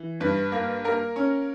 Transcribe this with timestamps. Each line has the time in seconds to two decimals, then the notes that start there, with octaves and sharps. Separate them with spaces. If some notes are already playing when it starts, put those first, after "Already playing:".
Already playing: E3
0.21 G2 B4
0.52 A#3
0.84 A#3 A#4
1.16 C#4